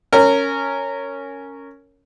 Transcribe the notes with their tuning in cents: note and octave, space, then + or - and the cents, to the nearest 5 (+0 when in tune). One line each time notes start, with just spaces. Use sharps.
C#4 +0 A#4 -15